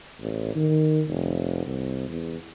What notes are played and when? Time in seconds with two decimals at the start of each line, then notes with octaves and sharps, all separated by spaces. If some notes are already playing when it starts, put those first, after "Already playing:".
0.20 A1
0.55 D#3
1.07 F1
1.66 C2
2.09 E2